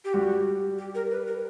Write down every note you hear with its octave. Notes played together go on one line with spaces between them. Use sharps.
G4
G3 F#4
G4
A#4
B4
A#4